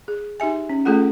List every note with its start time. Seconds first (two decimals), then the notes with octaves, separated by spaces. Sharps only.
0.08 G#4
0.40 D#4 G4 E5 G#5
0.69 C#4
0.85 A3 C#4 F4 G#4 A4 F#5